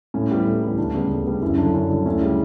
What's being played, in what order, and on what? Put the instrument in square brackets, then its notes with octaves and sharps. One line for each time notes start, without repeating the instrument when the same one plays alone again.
[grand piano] A2 C#4
E3 G3 B3
A2
E3 G3 B3
D2 D4
C#3 G3 B3
D2
C#3 G3 B3
F#2 C#4 E4
D3 F#3 D4
F#2 C#4
D3 F#3 D4
D2 C#4 E4
C#3 G3